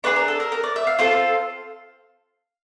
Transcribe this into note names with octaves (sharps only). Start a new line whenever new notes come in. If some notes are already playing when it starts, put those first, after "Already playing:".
D4 F4 G#4 B4
A#4
A4
A#4
A#4
D5
E5
F5
C4 F4 A4 F5